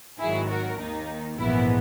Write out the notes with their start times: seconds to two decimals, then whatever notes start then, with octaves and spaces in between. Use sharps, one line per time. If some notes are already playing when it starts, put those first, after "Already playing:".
0.19 G#1 G#2 D#3 F#3 E4 G#4
0.49 F#4 A#4
0.79 D#2 D#3 A#3 D#4
1.38 A#1 G#2 E3 B3 E4